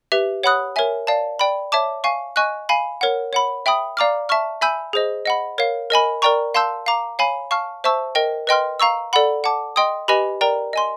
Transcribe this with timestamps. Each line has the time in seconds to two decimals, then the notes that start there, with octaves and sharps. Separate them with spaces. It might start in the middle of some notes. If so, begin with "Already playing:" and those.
0.12 G4 B4 E5
0.43 C#5 F#5 B5 D#6 F#6
0.76 A#4 C#5 E5 G#5
1.07 D5 F5 A5
1.39 D5 G5 B5
1.72 C#5 E5 A5 D6
2.04 F5 G#5 C#6
2.36 D#5 G#5 C#6 F#6
2.69 F5 G#5 B5
3.01 A#4 C#5 F#5
3.33 C#5 F#5 B5
3.66 E5 G5 B5 D#6
3.97 D5 F5 A#5 D6 F6
4.29 E5 A5 C#6 F6
4.61 E5 G#5 B5 E6 G6
4.93 G#4 C5 D#5
5.26 D#5 F#5 B5
5.58 A#4 C#5 F5
5.90 A#4 D#5 G#5 B5
6.22 A#4 D5 G5 A#5 C#6
6.54 F5 A5 C6 E6 G6
6.86 F5 A#5 D6
7.19 C#5 F5 G#5 B5
7.51 F5 A5 C#6 F6
7.84 C5 E5 A5 C#6 E6
8.15 A#4 D#5 G5
8.47 B4 D#5 G5 C6 F6
8.80 F5 A#5 C#6 E6
9.13 A4 D5 F#5 B5
9.44 F#5 A5 D6
9.76 D#5 G5 C6 D#6
10.08 G4 B4 D#5 G#5 B5
10.41 A#4 D5 G5 A#5
10.73 D#5 G#5 C6